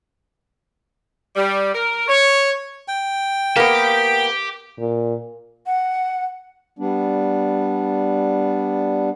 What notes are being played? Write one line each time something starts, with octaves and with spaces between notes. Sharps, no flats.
G3
A#4
C#5
G5
A#3 B3 G4
A#2
F#5
G3 B3 D4